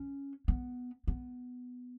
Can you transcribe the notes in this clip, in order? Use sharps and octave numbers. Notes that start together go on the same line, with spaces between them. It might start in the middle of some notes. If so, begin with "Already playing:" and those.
Already playing: C#4
B3
B3